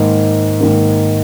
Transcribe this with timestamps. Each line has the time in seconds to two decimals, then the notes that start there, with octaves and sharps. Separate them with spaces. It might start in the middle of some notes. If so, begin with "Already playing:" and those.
Already playing: G#2 D#3 A#3
0.61 G#2 D#3 A#3